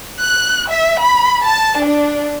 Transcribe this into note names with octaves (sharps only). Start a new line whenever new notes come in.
F#6
E5
B5
A5
D4